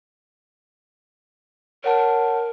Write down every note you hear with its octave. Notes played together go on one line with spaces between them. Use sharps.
A#4 C#5 F#5 A5